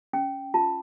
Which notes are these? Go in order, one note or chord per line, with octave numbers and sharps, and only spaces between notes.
C#4 G5
F4 A5